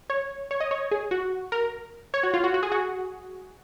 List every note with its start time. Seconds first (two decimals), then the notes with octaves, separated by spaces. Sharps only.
0.10 C#5
0.51 C#5
0.60 D#5
0.71 C#5
0.91 G#4
1.11 F#4
1.52 A#4
2.14 C#5
2.23 F#4
2.34 F4
2.44 F#4
2.54 F#4
2.63 G#4
2.72 F#4